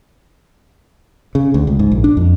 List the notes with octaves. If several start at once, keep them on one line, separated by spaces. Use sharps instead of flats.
C#3
D2
C#2
G#2
A#1
D4
F2